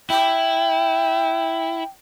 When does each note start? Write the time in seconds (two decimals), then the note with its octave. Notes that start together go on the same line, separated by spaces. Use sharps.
0.10 E4 G5